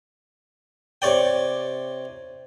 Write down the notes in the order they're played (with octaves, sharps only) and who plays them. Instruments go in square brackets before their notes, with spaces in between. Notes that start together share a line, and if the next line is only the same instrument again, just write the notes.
[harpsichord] C3 C#5 D5 G5